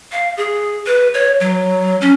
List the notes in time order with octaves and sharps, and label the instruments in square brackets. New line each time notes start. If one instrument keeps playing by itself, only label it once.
[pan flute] F5
G#4
B4
C#5
F#3
C#4